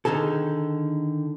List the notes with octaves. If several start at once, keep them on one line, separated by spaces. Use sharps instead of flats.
D3 D#3 D#4 G#4 A4